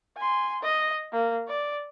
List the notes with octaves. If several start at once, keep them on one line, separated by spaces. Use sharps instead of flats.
G#5 C6
D#5
A#3
D5